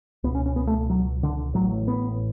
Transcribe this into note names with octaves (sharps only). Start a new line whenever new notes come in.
C#2 B2 B3
C#4
C#4
B3
A3
F#3
D3
A1 A2 F#3
B3